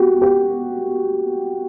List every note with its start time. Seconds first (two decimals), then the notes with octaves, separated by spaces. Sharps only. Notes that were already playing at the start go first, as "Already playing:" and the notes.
Already playing: F#4 G4
0.22 G4